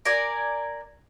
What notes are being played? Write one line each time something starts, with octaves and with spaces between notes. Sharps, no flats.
A#4 D5 G#5